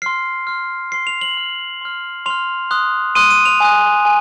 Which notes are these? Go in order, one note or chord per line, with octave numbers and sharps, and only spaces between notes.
C6 F6 C7
C6 F6
C6 F6 C7
F7
F#7
C6 F6
C6 F6
C6 F6 F7
C6 D#6 F#6
C6 D#6 F#6 D#7
D#7
F7
G#5 D#6 F#6
G#5